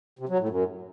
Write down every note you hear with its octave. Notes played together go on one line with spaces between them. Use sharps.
C3
F#3
A2
F#2